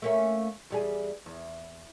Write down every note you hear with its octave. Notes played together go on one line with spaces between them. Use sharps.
A3 A#3 C#4
E2 G3 G#4
E2